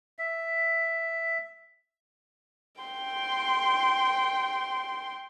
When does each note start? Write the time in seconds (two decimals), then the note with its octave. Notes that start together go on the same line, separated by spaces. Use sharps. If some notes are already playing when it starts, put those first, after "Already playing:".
0.19 E5
2.82 G5 C6